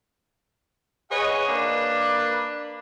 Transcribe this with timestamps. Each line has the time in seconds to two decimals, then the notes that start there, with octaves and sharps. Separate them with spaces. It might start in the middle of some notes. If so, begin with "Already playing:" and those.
1.11 G#4 B4 C#5 D#5 F5 F#5
1.48 A#3 D4 B4